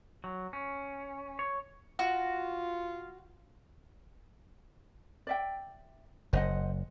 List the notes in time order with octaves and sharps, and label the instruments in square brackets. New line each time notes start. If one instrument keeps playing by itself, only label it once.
[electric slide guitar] F#3
C#4
C#5
[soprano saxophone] F4 [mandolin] F#4
[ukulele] D5 E5 G5
[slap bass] F#1 [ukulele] C5 D#5 F#5